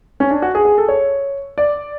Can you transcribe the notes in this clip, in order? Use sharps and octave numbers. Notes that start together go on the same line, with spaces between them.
C#4
D4
F#4
G#4
G#4
A4
C#5
D5